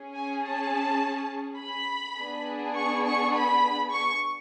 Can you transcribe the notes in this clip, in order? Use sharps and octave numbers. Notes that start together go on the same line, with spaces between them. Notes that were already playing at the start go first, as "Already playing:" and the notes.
Already playing: C#4 G#4
G#5
A5
B5
B3 D4 G#4
C#6
C#6
B5
C#6